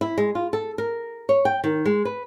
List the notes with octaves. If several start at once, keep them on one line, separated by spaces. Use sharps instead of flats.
E4
G#3
F4
A4
A#4
C#5
G5
D#3
G#3
B4